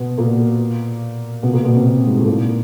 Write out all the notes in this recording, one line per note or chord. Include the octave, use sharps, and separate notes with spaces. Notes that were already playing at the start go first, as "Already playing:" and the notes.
Already playing: B2 B3
A#2 A#3
B2 B3
A#2 A#3
B2 B3
C3 C4
G#2 G#3
A2 A3
A#2 A#3